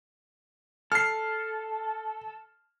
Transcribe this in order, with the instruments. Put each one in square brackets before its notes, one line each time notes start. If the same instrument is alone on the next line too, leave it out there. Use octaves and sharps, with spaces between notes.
[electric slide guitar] A4 [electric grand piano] F6 C7